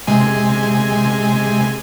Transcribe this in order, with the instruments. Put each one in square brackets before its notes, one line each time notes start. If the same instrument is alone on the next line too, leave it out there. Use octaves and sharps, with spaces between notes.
[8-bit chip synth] C3 G#3 G#5